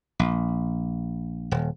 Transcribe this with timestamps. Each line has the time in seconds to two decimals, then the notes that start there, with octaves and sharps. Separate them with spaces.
0.19 A#1
1.51 D#1